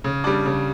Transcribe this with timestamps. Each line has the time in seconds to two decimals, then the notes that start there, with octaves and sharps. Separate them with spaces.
0.04 C#3
0.24 G3 D4
0.46 C#3